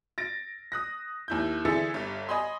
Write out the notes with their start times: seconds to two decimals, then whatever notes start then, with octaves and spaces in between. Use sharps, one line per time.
0.18 A6 A#6 D7
0.72 D#6 F#6 A#6
1.28 D#2 E4 G6
1.65 D3 E3 G#4 E5 A6 C#7
1.94 G1 G2
2.29 D#5 G#5 B5 C6